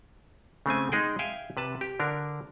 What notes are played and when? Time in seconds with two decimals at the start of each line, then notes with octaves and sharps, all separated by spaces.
0.66 C#3 A3 C4 G#5
0.92 G#3 D#4 G#4 G5
1.19 E5 F5 G5 G#5
1.57 C3 B4 A5
1.81 G4
2.00 D3 D4 A#4